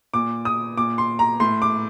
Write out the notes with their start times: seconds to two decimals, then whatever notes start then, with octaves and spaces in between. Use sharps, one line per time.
0.13 A#2 D6
0.45 D#6
0.77 A#2 D6
0.98 C6
1.19 A#5
1.40 A2 C6
1.62 D6